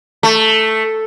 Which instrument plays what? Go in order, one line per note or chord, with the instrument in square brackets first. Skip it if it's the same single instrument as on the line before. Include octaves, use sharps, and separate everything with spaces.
[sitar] A3